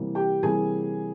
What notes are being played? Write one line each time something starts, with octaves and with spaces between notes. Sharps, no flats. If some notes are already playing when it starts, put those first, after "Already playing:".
Already playing: C3 E3 G3 A#3
G4 G5
C3 E3 G3 A#3 G#4 G#5